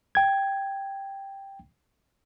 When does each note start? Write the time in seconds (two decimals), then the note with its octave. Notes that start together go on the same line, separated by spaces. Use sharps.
0.15 G5 G#6